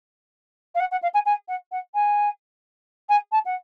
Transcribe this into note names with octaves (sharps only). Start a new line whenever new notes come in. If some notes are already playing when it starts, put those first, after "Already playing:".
F5
F#5
F#5
F5
G#5
G#5
F#5
F#5
G#5
G#5
A5
F#5